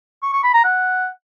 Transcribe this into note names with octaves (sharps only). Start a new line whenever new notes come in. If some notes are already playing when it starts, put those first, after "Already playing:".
C#6
C#6
B5
A#5
F#5